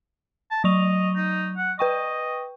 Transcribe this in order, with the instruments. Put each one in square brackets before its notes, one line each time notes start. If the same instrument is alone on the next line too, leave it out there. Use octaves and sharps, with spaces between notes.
[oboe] A5
[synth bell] F#3 C#6 F7 [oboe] D#5
[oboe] D#4
F#5
[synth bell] B4 G5 C#6 [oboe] D#5